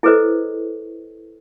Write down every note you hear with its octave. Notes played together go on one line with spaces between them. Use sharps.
E4 G#4 A4 B4 C5 D#5